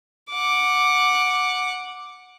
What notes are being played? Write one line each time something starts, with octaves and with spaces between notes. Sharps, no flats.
F#5 D6